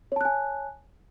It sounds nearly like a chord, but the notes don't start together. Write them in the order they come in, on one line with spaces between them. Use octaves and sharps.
C#5 A5 F#6 G#5